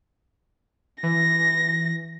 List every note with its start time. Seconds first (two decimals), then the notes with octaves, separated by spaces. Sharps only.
1.03 E3 A#6